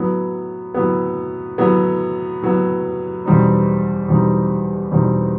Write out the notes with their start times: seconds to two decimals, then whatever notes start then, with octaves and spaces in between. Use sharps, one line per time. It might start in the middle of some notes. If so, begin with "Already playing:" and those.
Already playing: A2 F#3 B3
0.74 A2 F#3 B3
1.58 A2 F#3 B3
2.42 A2 F#3 B3
3.25 E2 B2 G3 C4 D#4
4.08 E2 B2 G3 C4 D#4
4.91 E2 B2 G3 C4 D#4